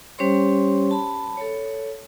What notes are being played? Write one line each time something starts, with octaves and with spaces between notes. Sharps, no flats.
G3 C#4 G4 C5 C#5 C6
A5 B5
A4 C#5